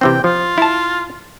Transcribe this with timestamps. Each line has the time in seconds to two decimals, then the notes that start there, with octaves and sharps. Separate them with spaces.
0.01 C3 E3 C4 G5
0.24 F3 F4
0.58 E4 A5